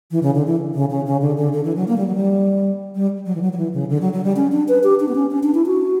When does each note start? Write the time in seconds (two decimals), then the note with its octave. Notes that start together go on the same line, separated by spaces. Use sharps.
0.11 E3
0.23 C#3
0.35 D3
0.47 E3
0.74 C#3
0.90 C#3
1.06 C#3
1.21 D3
1.37 D3
1.53 D3
1.64 E3
1.76 F#3
1.88 A#3
1.97 G3
2.07 F#3
2.15 G3
2.95 G3
3.26 F#3
3.35 E3
3.42 F#3
3.53 F#3
3.57 E3
3.74 C#3
3.90 D3
4.01 F#3
4.13 F#3
4.24 G3
4.36 C#4
4.52 D4
4.68 B4
4.83 G4
5.00 D4
5.08 B3
5.15 C#4
5.31 C#4
5.43 D4
5.54 E4
5.66 F#4